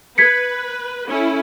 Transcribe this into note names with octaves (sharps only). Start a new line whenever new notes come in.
B4 G#6 B6 C#7
C#4 E4 A4